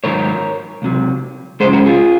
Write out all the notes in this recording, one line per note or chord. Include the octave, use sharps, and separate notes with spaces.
G#2 D#3 F#3 A#4 C#5
C#2 C3 F#3
F#2 C#3 F3 G#3 G#4 C5
F#4 A#4
F4 G#4